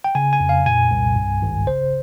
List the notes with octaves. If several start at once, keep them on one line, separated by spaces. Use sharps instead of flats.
G5
C#3 G#5
G#5
F2
F5
A#2 G#5
C2
G2
G#1
C#3 C5